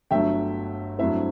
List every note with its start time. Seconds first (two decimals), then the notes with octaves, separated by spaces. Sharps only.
0.11 G1 G2 F#3 A3 E5 G5
0.99 G2 F#3 A3 C4 E4 C5 E5